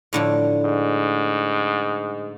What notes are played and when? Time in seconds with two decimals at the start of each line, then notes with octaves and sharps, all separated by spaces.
0.13 A2 D3 F3
0.64 G#2